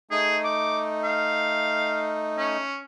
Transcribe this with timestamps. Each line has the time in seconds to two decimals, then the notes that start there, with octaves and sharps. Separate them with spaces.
0.11 A3 D#4 G#4
0.45 D6
1.04 F5
2.37 C#4